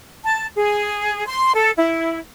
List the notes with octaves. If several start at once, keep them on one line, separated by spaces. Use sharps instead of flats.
A5
G#4
C6
A4
E4